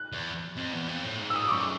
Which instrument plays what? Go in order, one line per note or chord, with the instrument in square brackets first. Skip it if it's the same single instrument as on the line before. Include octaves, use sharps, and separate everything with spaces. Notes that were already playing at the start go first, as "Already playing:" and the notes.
Already playing: [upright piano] F#6
[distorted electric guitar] E2
F2
E2
F2
A2
G#2
[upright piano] E6
D#6
D6
[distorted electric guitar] F#2 [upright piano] C#6